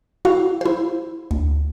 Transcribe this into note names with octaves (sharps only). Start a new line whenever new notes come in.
E4 F#4 F5
E4 C5
D2